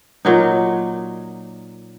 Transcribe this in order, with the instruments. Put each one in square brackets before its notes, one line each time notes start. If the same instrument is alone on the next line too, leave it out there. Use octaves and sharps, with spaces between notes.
[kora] A#2 F#3 D#4